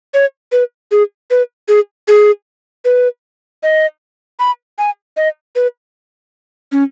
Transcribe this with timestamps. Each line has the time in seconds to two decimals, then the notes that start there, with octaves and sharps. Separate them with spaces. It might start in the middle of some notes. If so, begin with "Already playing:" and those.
0.14 C#5
0.52 B4
0.91 G#4
1.30 B4
1.68 G#4
2.08 G#4
2.85 B4
3.63 D#5
4.39 B5
4.78 G#5
5.17 D#5
5.55 B4
6.72 C#4